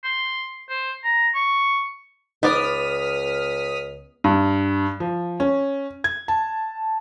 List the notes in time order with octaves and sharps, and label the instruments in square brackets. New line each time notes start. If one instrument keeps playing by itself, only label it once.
[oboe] C6
C5
A#5
C#6
[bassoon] C#2 [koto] B3 D5 [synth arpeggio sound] D#4 C5 [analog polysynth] D#6 F6 B6
[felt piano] G2
F3
C#4
G#6
A5